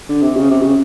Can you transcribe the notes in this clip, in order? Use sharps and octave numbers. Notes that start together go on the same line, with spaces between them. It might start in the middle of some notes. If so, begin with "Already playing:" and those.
D3
C3
C#3
C3
C#3